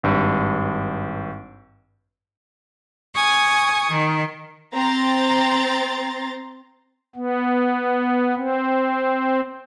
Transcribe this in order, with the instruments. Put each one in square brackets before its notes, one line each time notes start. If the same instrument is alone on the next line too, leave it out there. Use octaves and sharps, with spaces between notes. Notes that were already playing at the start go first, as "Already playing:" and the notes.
[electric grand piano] G#1 G2
[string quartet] G#5 C#6 D#6 G#6
D#3
[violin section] C4 A#5 C6 A6
[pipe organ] B3
C4